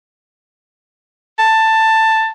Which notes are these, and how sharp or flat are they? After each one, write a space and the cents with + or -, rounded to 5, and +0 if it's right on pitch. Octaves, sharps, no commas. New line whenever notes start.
A5 +10